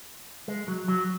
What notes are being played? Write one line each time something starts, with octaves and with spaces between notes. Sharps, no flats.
G#3
F#3
F#3